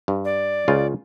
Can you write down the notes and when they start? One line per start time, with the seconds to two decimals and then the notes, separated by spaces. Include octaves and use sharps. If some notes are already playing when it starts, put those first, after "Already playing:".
0.08 G2
0.25 D5
0.68 C#2 C#3 F4